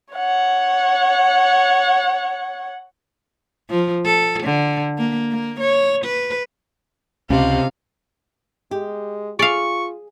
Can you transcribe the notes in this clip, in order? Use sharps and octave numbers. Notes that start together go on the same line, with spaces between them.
C#5 F#5
F3
A4
D3
A#3
A#3
C#5
B4
C#2 C3 C#4 F5
G#3 G4
F4 G#4 D5 F5 C#6